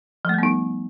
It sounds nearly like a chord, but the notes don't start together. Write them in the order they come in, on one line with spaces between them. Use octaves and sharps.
F3 A3 G3 B3 D#4